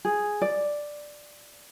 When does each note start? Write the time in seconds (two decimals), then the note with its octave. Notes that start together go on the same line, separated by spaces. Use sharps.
0.05 G#4
0.42 D5